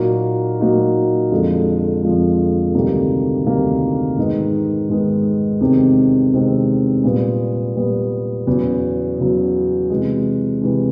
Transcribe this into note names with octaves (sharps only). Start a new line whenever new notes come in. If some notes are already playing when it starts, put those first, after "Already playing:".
Already playing: A#2 F#3 A#3 D#4 F#4
A#2 F#3 A#3 D#4 F#4
F2 D3 F3 G#3
F2 D3 F3 G#3
D2 C3 D#3 G3 A#3
D2 C3 D#3 G3 A#3
G#2 D#3 G#3 B3
G#2 D#3 G#3 B3
E2 C3 D#3 G#3 C4
E2 C3 D#3 G#3 C4
A#2 G3 B3
A#2 G3 B3
E2 C#3 F#3 B3
E2 C#3 F#3 B3
C3 E3 G#3
C3 E3 G#3